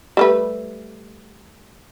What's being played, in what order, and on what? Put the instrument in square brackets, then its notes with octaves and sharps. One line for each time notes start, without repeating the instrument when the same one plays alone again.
[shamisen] G3 A3 B4